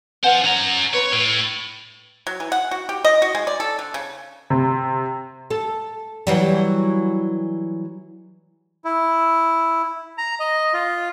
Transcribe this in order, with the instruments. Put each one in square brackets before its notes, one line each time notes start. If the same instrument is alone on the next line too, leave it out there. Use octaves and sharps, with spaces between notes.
[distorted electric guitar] F4 C5 [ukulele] B4 F#5 G#5
[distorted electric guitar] C#4 A#5 [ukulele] C#5
[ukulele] B4 B5 [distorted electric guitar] C#5
[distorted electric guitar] A2
[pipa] F#3
E3
F#5
F#4
G4
D#5
F#4
G#3
D5
A4
D3
C#3
[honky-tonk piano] C3
[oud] A4
E3 F#3 G3
[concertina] E4
A#5
D#5
F4